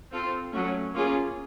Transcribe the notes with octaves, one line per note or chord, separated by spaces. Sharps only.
C4 F4 A4
F#3 A3 C#4
A#3 C#4 F4 G#4